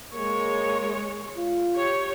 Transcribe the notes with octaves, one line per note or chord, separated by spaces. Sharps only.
G#3 A#3 C#5
F4
G4 C#5